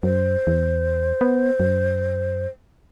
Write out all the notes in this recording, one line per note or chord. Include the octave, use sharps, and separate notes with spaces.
F#2 C5
E2
B3
F#2